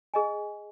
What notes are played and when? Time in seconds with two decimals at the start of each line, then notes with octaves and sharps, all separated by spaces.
0.14 G#4 D#5 G#5